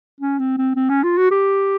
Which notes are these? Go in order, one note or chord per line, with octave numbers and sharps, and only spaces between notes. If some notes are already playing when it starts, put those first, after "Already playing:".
C#4
C4
C4
C4
C#4
F4
F#4
G4